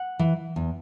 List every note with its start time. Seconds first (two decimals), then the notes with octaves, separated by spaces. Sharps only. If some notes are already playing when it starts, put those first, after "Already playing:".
Already playing: F#5
0.19 E3
0.56 E2